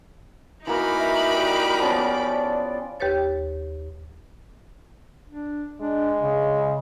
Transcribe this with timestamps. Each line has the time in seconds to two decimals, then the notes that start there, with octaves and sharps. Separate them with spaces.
0.67 E3 A#3 D#4 F#4 A#4 B4 B5 D6
0.99 E5
1.34 G4 D5
1.79 F3 B3 C#4 D5
3.00 D#2 G4 B4 C#5 A6
5.30 D4
5.81 G#3 D4
6.21 C#3